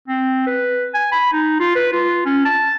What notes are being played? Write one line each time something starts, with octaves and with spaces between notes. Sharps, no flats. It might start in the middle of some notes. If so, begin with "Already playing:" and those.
C4
B4
G#5
B5
D#4
F4
B4
F4
C#4
A5